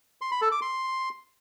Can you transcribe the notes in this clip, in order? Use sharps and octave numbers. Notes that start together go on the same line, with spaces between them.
C6
B5
A4
D6
C6